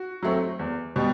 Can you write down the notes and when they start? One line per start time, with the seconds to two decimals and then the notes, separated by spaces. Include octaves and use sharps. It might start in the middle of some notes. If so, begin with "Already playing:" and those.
Already playing: F#4
0.23 F#3 A3 C4
0.59 E2
0.96 B2 G3